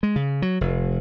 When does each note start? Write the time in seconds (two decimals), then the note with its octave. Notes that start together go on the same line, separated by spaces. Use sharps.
0.03 G#3
0.16 C#3
0.42 F#3
0.61 F1